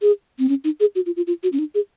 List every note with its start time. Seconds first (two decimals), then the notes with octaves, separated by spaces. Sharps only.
0.02 G#4
0.39 C4
0.49 C#4
0.64 D#4
0.80 G#4
0.95 F#4
1.06 F4
1.17 F4
1.27 F4
1.43 F#4
1.53 C#4
1.59 D#4
1.75 G#4